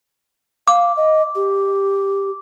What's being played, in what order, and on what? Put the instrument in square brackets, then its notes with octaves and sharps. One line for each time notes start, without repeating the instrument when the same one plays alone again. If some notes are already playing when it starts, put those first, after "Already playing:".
[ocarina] F5 [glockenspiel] D6
[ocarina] D#5
G4